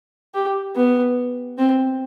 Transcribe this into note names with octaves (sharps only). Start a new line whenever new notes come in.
G4
B3
C4